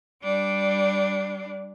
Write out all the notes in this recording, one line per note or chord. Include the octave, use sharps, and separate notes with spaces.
G3 D4